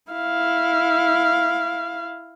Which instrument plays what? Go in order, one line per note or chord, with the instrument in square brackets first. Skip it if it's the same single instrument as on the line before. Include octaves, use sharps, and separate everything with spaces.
[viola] E4 F5